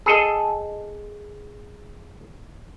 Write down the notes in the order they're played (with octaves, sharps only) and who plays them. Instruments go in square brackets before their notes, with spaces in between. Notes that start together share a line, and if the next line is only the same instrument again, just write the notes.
[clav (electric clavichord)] G#4 A4 D#5